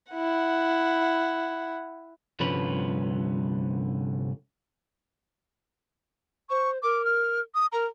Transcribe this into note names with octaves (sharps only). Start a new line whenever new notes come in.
E4 F#5
C2 G2 D3 F3 C#4 B4
C5 C#6
A#4 D6
F6
D#6
A#4 A#5